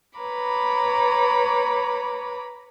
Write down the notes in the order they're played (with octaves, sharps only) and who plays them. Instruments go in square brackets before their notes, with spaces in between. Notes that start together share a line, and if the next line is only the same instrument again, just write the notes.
[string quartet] B4 C#5 A#5 B5 D6